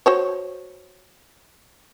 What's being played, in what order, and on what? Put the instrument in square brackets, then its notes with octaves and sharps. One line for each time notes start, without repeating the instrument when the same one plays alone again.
[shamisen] F#4 C5 C#5